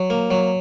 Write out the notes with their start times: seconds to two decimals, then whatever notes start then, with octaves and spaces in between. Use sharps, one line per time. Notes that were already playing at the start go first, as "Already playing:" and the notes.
Already playing: F#3
0.10 A#3
0.31 F#3